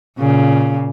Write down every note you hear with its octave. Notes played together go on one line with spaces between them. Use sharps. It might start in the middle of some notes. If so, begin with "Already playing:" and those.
A#2 C#3